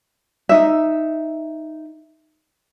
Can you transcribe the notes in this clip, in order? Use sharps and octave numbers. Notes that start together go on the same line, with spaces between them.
D#4 E5